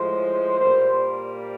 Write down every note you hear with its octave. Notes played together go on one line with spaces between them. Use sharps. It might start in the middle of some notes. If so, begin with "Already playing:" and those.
Already playing: A2 F3 G#3 C5
A#2 G3 A#3 C5